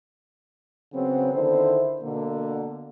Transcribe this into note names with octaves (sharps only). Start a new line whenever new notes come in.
C#3 F#3 B3 C4
D3 D#3 E4 C5
B2 D3 A#3